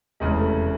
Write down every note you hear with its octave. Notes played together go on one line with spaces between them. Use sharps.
F1 E2 C#3 G#3
A3